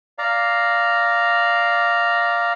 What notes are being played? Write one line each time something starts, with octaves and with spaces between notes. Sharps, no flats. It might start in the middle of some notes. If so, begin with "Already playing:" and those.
D5 F5 A#5